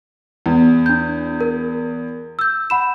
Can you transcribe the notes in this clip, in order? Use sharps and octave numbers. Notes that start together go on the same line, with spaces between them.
E2
D4 G6
A#4
E6 G6
F#5 B5 E7